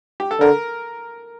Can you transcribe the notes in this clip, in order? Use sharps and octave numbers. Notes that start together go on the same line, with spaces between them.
G4
A4
D3 A#4